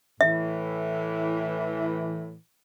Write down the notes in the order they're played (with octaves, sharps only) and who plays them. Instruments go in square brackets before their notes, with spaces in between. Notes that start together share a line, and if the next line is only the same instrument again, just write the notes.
[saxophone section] A2 E3 [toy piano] E5